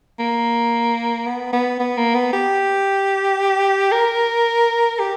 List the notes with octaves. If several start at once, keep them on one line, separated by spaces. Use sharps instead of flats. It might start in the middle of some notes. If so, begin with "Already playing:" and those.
A#3
B3
B3
B3
A#3
B3
G4
A#4
G4